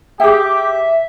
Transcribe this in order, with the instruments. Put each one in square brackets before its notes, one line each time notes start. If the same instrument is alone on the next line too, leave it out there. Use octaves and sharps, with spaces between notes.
[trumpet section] G4 [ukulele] G#4 G5 [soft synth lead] E5